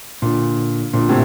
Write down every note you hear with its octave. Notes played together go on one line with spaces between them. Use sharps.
A#2 D3
A#2 D3
A2 C3